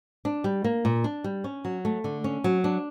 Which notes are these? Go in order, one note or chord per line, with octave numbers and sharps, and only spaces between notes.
D4
G3
A#3
A#2
D4
G3
C#4
F#3
A3
D3
C#4
F#3
D4